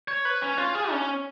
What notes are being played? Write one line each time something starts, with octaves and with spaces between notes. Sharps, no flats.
C#5
B4
C#4
F4
G#4
C#4